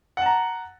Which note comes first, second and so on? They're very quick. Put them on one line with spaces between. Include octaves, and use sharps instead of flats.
F#5 A5 A#5